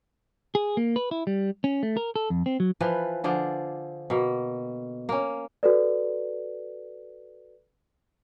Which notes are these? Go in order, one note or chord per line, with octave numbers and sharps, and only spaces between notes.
G#4
A#3
B4
E4
G3
C#4
A3
A#4
A4
F2
C4
F#3
E3 F3 B4
D3 F3 G#4 D5
B2 A#3
A#3 C#4
F#4 A4 B4 D5